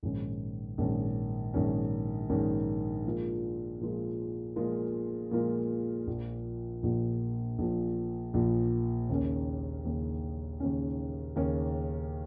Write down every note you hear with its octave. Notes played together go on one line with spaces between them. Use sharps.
A#1 G#2 D#3 C#4
A#1 G#2 D#3 C#4
A#1 G#2 D#3 C#4
A#1 G#2 D#3 C#4
A#2 F3 G#3 F4 A#4
A#2 F3 G#3 F4 A#4
A#2 F3 G#3 F4 A#4
A#2 F3 G#3 F4 A#4
A#1 A#2 F3
A#1 A#2 F3
A#1 A#2 F3
A#1 A#2 F3
D#2 C#3 A#3 C#4
D#2 C#3 A#3 C#4
D#2 C#3 A#3 C#4
D#2 C#3 A#3 C#4